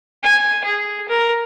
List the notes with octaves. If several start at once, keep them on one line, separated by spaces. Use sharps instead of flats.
G#5
G#4
A#4